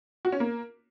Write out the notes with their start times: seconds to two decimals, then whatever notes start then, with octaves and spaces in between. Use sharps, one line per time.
0.25 F#4
0.32 C#4
0.40 A#3